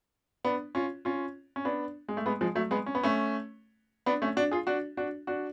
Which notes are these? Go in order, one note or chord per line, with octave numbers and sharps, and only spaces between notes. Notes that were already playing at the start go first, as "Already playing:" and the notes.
B3 D4
C#4 F4
C#4 F4
C#4
B3 D4
G#3
A3
G#3 B3
F3 G#3
F#3 A3
G#3 B3
C#4
B3
A3 C#4
B3 D4
A3 C#4
D4 F#4
F4 G#4
D4 F#4
D4 F#4
D4 F#4